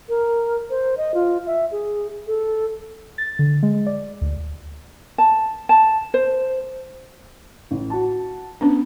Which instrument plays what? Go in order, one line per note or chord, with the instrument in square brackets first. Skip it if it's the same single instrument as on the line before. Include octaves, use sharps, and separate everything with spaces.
[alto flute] A#4
C5
D#5
F4
E5
G#4
A4
[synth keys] A6
D3
G#3
D5
D2
[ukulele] A5
A5
C5
[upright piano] A1
F#4 A5
[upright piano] B3 [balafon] C#4 D4